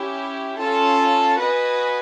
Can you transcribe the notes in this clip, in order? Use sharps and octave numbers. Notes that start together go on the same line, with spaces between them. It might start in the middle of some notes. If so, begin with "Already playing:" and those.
Already playing: C#4 E4 G4
C#4 F4 A4
F#4 B4 D#5 G#5